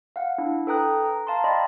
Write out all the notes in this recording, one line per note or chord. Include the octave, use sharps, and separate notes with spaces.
F5 F#5
D4 E4
A4 B4 G5 A#5 D#6 F#6
A#5
F5 A5 A#5 C6
D5 D#5 F5 G5 B5 C6